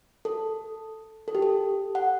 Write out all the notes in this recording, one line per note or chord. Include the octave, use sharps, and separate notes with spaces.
A4
A4
G4
A4
F#5